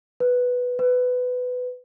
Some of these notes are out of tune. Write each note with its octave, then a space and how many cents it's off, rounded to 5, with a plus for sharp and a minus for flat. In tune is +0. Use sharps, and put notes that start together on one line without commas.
B4 +0
B4 +15